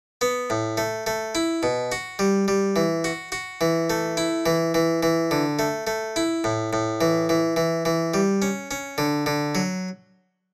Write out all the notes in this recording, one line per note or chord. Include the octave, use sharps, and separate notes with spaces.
B3
A2
A3
A3
E4
B2
F#4
G3
G3
E3
F#4
F#4
E3
A3
E4
E3
E3
E3
D3
A3
A3
E4
A2
A2
E3
E3
E3
E3
G3
C#4
C#4
D3
D3
F#3